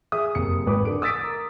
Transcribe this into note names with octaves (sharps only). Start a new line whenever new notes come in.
G#4 E5 D#6
F#1 C3 C#7
G#1 B4 D6
D3 D7
D#6 E6 A6 B6 D7
A#4